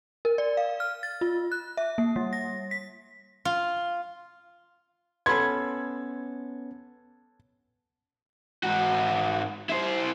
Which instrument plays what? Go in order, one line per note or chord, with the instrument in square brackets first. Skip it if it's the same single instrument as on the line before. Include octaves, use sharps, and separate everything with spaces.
[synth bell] A#4
D5
F5
F6
A6
F4
F#6
E5
A#3
G3
A#6
B6
[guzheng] F4
[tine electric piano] B3 C#4 [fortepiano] A4 B5 C6 [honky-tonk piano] G#6
[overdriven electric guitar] G#2 F#4
E4 C5